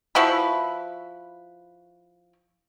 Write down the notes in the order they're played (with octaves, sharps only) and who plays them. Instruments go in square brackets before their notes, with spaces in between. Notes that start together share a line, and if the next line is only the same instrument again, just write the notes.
[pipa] F3 E4 F#4 B4